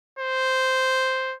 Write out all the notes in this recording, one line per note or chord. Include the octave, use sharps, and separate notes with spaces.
C5